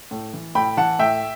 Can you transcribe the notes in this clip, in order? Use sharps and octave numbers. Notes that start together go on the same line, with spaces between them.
A2
E3
A2 G5 B5
E3 F#5 A5
A2 E5 G5